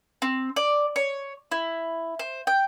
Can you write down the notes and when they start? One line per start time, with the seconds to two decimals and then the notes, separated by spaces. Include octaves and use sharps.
0.22 C4
0.56 D5
0.96 C#5
1.52 E4
2.19 C5
2.47 G5